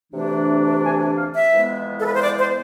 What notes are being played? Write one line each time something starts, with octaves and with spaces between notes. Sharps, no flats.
D2 C3 E3 A3 D4
G#5
F5
E5
F2 E3 G#3 B3
A4
B4
C5
D5
C5